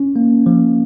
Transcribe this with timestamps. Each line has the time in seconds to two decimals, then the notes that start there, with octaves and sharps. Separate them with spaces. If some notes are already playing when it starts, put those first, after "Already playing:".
Already playing: C#4
0.16 A#3
0.46 F3